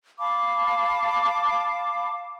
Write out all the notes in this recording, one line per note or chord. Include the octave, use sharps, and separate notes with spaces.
F5 A5 B5 D6